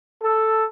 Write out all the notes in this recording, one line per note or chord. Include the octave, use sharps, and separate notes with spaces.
A4